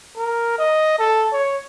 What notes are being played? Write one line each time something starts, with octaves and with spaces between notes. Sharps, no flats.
A#4
D#5
A4
C#5